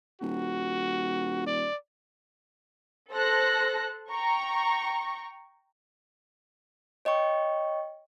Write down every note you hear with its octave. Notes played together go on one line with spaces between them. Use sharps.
D#1 F#4
D5
A4 C5 A5 F#6 A#6
G5 A#5 C#6
C#5 D#5 G5 C#6